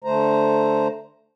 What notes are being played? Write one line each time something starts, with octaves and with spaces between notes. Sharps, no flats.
D3 A3 C5 A#5